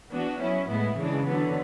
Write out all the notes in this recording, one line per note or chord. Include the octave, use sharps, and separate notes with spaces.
E3 B3 D4 F#4
F#3 C#4 E4
A2 G#3 B3 E4
C#3 E3 G#3 D4
D3 F#3 B3